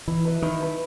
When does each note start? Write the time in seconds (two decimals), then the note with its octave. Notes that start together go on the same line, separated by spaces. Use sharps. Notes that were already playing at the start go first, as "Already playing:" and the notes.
0.08 E3 E4
0.25 B4 E5
0.42 D#3 E4
0.60 B4 E5